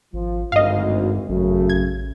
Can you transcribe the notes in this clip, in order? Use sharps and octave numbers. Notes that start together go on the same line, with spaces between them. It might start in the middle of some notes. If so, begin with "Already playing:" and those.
G#1 F3
G#1 D2 G2 D#5 F5
G#1 F#2 C#3 A3
A1 G#6